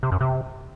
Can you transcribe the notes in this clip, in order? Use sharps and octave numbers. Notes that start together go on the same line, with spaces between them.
C3
F#2
C3